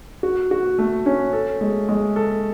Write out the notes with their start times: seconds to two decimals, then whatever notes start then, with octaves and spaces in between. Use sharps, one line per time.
0.23 F#4
0.51 F#4
0.78 A3
1.06 C#4
1.33 A4
1.61 G#3
1.89 G#3
2.16 A4